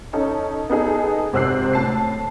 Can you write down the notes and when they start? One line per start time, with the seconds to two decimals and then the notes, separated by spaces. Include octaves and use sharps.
0.13 C#4 D#4 A4
0.69 B3 D#4 G#4 A4
1.33 G#1 C3 C4 E6 F#6 C7
1.73 A2 A5 C7